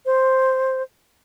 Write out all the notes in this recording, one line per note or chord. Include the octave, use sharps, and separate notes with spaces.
C5